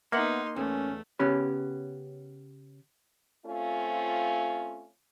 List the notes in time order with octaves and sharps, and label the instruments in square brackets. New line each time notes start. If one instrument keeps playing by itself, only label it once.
[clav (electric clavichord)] A#3 F#5 [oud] B3 E5 [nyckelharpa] D#4 C6
[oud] E2 [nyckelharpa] A3 [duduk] C#4
[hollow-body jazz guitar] C#3 B3 C#4 G4 B4
[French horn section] A3 C4 C#4 F4